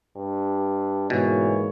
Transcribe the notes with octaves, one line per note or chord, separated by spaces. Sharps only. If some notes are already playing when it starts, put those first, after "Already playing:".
G2
G#2 B2 E3 A#3 C#5